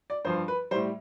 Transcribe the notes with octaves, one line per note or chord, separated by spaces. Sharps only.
D5
G2 F3 C5
B4
A2 G3 C5